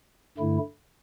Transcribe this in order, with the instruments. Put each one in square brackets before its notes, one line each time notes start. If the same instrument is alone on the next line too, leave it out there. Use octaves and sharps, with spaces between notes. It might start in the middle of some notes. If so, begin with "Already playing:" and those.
[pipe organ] G2 D3 A3 E4